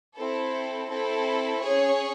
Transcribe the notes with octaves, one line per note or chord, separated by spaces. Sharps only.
C4 E4 A4
C4 E4 A4
C#4 G#4 C#5